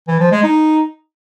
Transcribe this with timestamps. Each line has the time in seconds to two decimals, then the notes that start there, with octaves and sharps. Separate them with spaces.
0.08 E3
0.20 F3
0.32 G#3
0.44 D#4